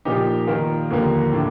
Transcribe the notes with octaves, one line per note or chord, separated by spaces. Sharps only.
A#2 F3 A#3 D#4 G4
D#3 A#3 F4 A#4
D#2 D3 F3 A#3
A2 A3 D4